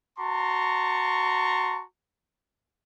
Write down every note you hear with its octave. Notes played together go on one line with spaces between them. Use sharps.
F#4 A5 A#5 C6 C#6